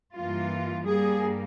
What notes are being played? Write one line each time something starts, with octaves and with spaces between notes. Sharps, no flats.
G2 E3 A#3 F4
G2 G3 A#3 G#4